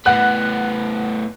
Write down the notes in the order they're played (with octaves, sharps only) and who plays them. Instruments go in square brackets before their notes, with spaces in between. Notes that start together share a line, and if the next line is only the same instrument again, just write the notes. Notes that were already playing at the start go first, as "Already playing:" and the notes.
[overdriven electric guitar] A2 B3 [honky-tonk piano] F#5 F#6